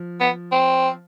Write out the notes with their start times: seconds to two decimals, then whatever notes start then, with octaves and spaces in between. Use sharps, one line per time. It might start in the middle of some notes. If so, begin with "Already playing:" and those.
Already playing: F3
0.20 B3
0.52 C4